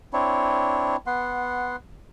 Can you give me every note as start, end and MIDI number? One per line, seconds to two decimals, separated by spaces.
0.13 0.96 60
0.13 0.96 62
0.13 0.96 64
0.13 0.96 73
1.07 1.76 59
1.07 1.76 78
1.07 1.76 84